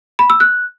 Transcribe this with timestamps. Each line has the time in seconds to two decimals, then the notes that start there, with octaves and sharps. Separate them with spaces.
0.19 B5
0.30 E6
0.40 F#6